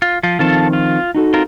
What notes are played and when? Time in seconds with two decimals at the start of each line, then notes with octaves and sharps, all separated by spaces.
0.02 F4
0.23 F3 F4
0.39 D#3 F3 C4 F4 A4 A5
0.73 F4
1.15 D#4 F#4 A4
1.34 C4 F4 A#4